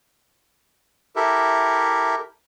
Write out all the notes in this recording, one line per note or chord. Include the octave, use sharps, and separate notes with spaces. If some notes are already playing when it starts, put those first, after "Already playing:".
E4 G4 A4 A#4 E5